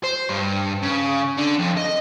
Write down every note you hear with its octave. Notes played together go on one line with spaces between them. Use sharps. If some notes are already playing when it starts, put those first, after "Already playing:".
C5
G2
C#3
D3
F2
D#5